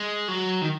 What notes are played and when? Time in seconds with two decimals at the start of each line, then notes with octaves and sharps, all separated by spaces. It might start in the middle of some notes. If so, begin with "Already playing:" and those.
Already playing: G#3
0.28 F#3
0.62 D#3